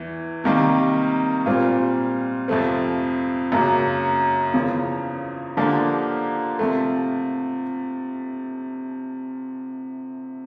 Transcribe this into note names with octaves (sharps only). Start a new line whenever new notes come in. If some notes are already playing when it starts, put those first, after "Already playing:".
Already playing: E2 E3
C3 D#3 G3 A#3
A#2 G3 C4 F4
F2 C3 F3 A3 C4
F#2 C#3 F#3 A#3
E2 C#3 F3
D3 F3 A#3 D4 G4
C3 F3 A3